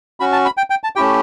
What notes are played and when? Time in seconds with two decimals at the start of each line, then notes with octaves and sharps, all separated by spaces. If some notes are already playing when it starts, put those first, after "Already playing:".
0.20 C#4 F#4 B5
0.32 A5
0.45 B5
0.57 G5
0.70 G5
0.84 A5
0.96 A3 C#4 E4 G4 G5